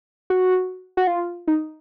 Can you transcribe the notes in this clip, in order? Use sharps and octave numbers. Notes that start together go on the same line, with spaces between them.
F#4
F#4
F4
D#4